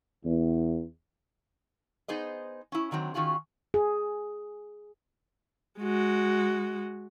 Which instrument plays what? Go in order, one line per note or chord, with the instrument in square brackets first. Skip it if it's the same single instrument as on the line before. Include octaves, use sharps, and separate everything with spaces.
[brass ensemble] E2
[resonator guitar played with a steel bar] B3 D#4 G#4 C5 D#5
C#4 E4
D3 D#3 F#3 C4
D#3 C#4 F4 F#4 G#4
[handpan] G#4
[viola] G#3 F#4